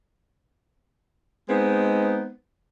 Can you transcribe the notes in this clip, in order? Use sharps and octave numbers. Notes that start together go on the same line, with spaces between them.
G#3 B3 C4 D#4